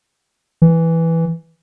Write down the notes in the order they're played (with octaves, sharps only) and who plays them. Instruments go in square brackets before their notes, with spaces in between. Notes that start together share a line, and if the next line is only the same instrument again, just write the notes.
[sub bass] E3